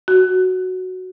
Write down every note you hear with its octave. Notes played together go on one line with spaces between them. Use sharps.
F#4